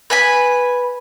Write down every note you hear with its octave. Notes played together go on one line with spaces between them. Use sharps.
B4 G#5 B5